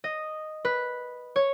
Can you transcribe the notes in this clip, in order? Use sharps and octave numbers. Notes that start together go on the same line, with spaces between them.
D#5
B4
C#5